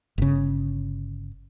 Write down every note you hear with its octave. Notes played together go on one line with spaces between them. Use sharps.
G1 C#3